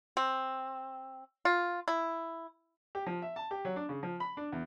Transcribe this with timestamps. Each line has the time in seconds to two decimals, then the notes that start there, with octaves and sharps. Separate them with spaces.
0.17 C4
1.45 F4
1.88 E4
2.95 G4
3.06 F3
3.22 E5
3.36 A5
3.51 G4
3.65 F#3
3.76 D4
3.89 C#3
4.03 F3
4.20 B5
4.37 D4
4.52 E2